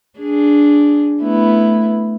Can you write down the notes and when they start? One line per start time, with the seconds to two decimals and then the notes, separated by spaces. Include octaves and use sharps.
0.19 D4 G#4
1.22 A3 B3 E4